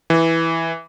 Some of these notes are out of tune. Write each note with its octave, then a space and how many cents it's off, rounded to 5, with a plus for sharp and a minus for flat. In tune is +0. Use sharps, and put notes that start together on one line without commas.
E3 -5